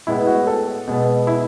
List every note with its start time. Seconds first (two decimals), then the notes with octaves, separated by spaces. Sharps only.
0.07 A2 G#3 B3 E4
0.27 F#4
0.47 A4
0.87 B2 G#3 B3
1.27 E4